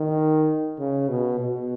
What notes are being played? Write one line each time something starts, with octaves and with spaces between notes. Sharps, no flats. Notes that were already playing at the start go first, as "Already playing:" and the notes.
Already playing: D#3
C#3
B2
B2